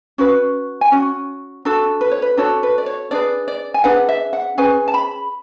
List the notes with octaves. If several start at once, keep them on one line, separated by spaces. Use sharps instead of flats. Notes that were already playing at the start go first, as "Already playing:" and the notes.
C#4 F#4 B4
G#5
C#4 F#4
D4 F#4 A4
B4
C#5
B4
D4 F#4 A4 C#5
B4
D5
C#5
D4 G#4 B4 D5
D5
G#5
D4 G#4 B4 F#5
E5
F#5
C#4 G#4 B4 G#5
A5
B5